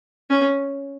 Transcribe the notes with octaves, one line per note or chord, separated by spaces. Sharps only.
C#4